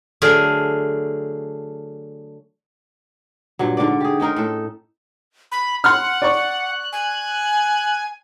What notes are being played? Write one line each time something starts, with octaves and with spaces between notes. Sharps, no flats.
D3 F#3 A3 G#4 A#4
G2 A#2 F#3
G#2 D3 F#4 D5
G4 G#4
G#3 C#4 D#4 A#4
A2 A4
B5
F#5 C6 F6 F#6
D5 C#6
G#5